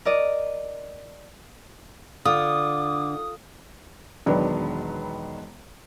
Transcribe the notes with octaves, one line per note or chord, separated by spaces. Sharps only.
A#4 D5 D#5
D3 F4 D6 D#6
E1 D#3 F#3 B3 D4